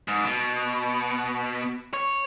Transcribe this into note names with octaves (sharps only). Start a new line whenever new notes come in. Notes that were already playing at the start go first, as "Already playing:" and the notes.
G#2
B2
C#5